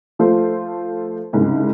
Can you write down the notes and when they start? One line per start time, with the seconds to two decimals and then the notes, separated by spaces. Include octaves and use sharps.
0.19 F3 A3 F4 A4 C5
1.33 C2 G#2 C#3